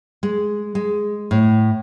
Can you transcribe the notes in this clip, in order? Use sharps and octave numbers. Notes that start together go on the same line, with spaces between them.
G#3
G#3
A2